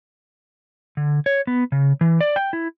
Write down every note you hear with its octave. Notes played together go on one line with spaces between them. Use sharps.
D3
C#5
B3
C#3
E3
D5
G5
E4